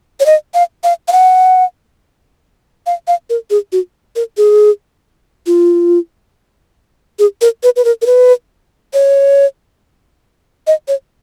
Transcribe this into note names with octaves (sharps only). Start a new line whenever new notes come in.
C#5
D#5
F5
F5
F5
F#5
F5
F5
A#4
G#4
F#4
A#4
G#4
F4
G#4
A#4
B4
B4
A#4
A#4
B4
C#5
D#5
C#5